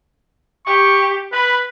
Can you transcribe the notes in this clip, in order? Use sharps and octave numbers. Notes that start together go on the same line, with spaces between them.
G4 C#6
B4 B5